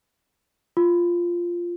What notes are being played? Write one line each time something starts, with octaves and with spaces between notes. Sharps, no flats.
F4